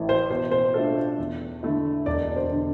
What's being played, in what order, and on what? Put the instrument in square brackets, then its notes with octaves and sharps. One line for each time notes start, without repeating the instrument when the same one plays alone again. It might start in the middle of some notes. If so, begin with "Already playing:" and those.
Already playing: [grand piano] A1 A2 E3 A3 E4
[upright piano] C5
[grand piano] B2 [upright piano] C5
[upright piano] C5
[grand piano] A3 D4 F4 A4
E2
D3 A3 E4
[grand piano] E1 [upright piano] D5
[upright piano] D5
C5
[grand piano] D3